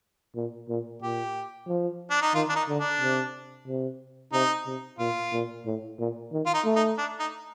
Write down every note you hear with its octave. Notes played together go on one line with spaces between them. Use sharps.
A#2
A#2
A#2 G4
F3
D4
D#4
D#3 F4
D4
D#4
D3
D4
C3
C3
C3 D#4
C3
A#2 F4
A#2
A2
A#2
D#3
F4
D#4
A3
D#4
D4
D#4